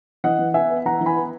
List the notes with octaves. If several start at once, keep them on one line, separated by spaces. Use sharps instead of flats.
E3 D#5 F#5
E3
B3 E5 G#5
B3
E3 F#5 A#5
E3
G#5 B5
B3